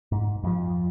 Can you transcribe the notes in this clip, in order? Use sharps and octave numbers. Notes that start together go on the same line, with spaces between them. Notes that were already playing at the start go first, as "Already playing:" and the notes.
G#2
F2 F3